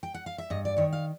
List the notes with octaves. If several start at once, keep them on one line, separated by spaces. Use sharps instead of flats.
G5
F#5
F5
E5
G2 D#5
D5
D#3 C#5
F5